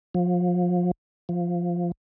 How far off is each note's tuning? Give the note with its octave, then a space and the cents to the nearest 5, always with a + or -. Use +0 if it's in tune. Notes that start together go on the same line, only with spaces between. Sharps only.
F3 +30
F3 +0